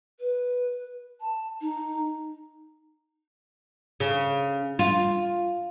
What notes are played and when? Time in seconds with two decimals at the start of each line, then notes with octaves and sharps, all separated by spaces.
0.20 B4
1.21 A5
1.61 D#4
4.00 C#3
4.79 F4